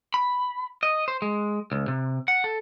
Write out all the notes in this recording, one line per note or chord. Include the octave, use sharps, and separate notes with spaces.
B5
D#5
C5
G#3
C#2
C3
F#5
A4